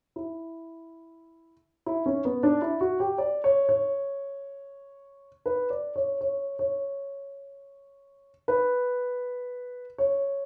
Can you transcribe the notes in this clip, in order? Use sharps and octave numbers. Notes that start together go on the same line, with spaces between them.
E4
E4
C#4
B3
D4
E4
F#4
G4
D5
C#5
C#5
B4
D5
C#5
C#5
C#5
B4
C#5